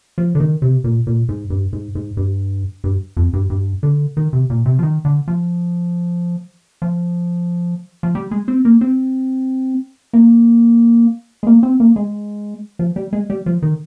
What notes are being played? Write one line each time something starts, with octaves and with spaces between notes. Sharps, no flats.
F3
D3
D#3
C3
A#2
A#2
G#2
G2
G#2
G#2
G2
G2
F2
G2
G2
D3
D#3
C3
A#2
C3
F3
D#3
D3
F3
F3
F3
G3
G#3
C4
A#3
C4
A#3
G#3
A#3
C4
A#3
G#3
F3
G3
G#3
G3
F3
D#3